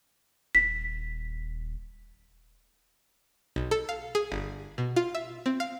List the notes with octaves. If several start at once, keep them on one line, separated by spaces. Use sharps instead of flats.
D#1 B6
B1
A4
F5
G#4
G1
B2
F4
E5
C4
F5